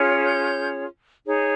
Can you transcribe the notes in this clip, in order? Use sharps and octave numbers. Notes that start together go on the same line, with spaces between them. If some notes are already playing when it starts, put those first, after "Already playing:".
Already playing: C#4 F4 G#4 C#5
G6
D#4 G#4 C#5